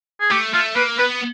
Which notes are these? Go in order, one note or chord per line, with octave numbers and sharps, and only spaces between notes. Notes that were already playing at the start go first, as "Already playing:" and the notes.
G#4
A3 G4
A3 F4
A#3 B4
B3 B4